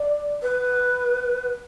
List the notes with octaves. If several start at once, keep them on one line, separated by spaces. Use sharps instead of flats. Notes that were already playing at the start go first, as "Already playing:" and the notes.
Already playing: D5
B4